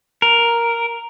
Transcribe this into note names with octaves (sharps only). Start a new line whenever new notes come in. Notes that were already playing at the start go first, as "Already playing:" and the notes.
A#4